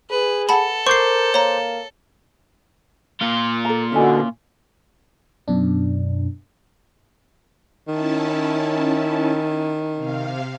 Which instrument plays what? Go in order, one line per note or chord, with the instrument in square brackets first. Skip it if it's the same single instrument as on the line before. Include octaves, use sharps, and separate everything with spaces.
[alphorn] G#4 [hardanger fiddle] B4
[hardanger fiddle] A4 [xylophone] F#5 A5 B5
[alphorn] A#4 [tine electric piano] C5 D6 G6 [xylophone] C#6 C7
[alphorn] A#3 [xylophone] C#5 A#5
[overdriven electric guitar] A#2 F4
[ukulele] A4 A#5
[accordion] B2 D3 [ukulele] C#4 E4 G#5
[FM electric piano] F#2 B2 D4
[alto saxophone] D#3 [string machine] C#4 E4 A5
[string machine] C3 F5